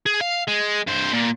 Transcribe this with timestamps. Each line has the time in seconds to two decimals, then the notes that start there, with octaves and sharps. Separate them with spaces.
0.06 G#4
0.21 F5
0.48 G#3
0.87 G2 C5
1.13 A#2